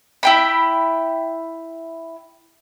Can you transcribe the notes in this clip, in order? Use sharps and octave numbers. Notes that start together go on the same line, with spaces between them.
E4 G5 B5